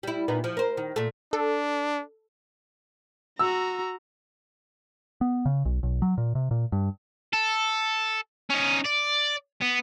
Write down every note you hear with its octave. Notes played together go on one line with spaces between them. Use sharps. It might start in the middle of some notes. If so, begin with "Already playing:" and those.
G3 E4
A#2 B3 D#4
F3
A#4 C5
D#3
A#2 A3
D4 A4
F#4 A#5 E6
B3
C#3
B1
B1
F#3
A#2
C3
A#2
G2
A4
C#4 D#4
D5
B3